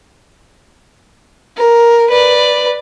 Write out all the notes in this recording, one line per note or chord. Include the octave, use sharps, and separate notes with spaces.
A#4
B4 D5